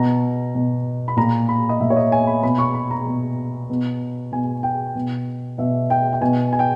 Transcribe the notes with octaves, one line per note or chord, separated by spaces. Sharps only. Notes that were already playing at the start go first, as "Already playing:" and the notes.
Already playing: B2 A#5
B2
B5
A#2 A#5
B5
D#5
A#2 E5
C#5
D#5
G#5
B5
B2 B5
C#6
B5
A#5
B2
B2
B2 G#5
G5
B2
B2 E5
G5
G5
B2 G#5
G#5
G5